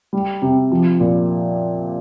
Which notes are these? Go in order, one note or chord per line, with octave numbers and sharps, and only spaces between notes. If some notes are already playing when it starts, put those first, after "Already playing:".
G3
C3
F3
A#2